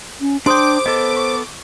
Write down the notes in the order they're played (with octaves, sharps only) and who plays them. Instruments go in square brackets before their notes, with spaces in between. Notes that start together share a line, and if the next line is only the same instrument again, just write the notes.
[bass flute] C#4
[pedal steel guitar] D4 G5 [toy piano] G#4 C6 D#6 [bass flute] C5 [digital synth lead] D6
[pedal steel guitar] B3 A4 [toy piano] D#5
[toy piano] C#6